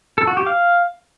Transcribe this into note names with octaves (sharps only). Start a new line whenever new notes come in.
A4
F#4
G4
F5